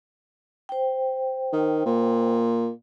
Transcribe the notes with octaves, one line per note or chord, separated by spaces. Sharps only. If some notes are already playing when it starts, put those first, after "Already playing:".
C5 G5
D#3
A#2